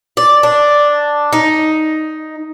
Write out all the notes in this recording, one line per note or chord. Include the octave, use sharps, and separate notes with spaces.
D5
D4
D#4